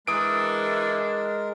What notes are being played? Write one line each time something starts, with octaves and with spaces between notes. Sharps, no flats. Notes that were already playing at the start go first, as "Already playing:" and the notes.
E3 G#3 D4 A#4 D#6 D7